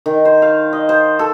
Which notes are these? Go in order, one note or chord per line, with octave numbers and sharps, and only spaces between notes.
D#3
C5
F5
D#5
C5
A4